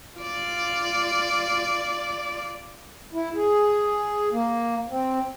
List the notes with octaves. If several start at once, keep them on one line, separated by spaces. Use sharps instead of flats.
F4 D5
E4
G#4
A#3
C4